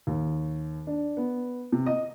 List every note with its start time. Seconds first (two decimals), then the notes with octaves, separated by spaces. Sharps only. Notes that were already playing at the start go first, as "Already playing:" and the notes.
0.07 D#2
0.87 D4
1.17 B3
1.72 C3
1.86 D#5